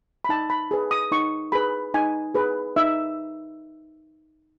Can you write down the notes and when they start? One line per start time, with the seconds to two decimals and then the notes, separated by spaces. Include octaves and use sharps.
0.25 B5
0.29 D#4 A5
0.50 B5
0.71 G#4 B4
0.91 D#6
1.12 D#4 C#6
1.52 G#4 B4 B5
1.94 D#4 G#5
2.34 G#4 B4
2.76 D#4 E5